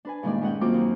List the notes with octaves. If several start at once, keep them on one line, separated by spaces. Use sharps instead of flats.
D4 B4 G#5
G2 A#2 D#3 G#3 C#4 D5
G#3 C#4 F#5 G5
F#2 A#3 C4 F4 D6 G6
D#2